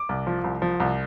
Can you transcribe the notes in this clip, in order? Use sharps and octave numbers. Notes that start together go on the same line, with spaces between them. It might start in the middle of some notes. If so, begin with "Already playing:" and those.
Already playing: D6
C2
F3
C2
F3
C2